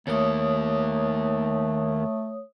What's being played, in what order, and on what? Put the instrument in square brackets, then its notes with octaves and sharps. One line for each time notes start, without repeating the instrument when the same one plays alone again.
[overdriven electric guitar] D#2 A#3 [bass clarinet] A3 [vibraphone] C#5 D#6